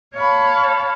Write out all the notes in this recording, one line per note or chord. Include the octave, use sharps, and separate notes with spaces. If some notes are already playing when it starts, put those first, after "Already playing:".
C#5 F5 A5 B5